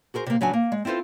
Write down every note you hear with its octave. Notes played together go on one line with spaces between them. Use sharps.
F#4 G#4 A#4 C5
C3 A#3
C#3 F#3 D4 G#5
A#3
G#3
C4 E4 F4 A4 C5